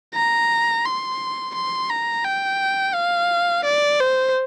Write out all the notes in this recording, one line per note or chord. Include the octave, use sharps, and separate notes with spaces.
A#5
C6
C6
A#5
G5
F5
D5
C5